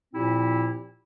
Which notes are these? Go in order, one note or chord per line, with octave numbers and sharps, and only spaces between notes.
A#2 F3 C4 E4 G4